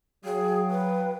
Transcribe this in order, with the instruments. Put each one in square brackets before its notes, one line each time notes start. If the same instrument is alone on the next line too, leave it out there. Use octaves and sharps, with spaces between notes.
[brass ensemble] F#3 [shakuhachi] G#4 [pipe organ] F5 G5
[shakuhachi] B4